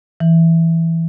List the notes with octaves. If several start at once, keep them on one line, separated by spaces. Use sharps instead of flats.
E3